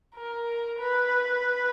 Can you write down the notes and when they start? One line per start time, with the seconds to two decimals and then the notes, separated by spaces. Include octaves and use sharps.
0.15 A#4
0.79 B4